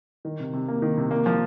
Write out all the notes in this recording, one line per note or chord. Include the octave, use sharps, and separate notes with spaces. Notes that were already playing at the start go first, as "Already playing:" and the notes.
D#3
C3
C3
A#3
D#3
C3
A#3
F3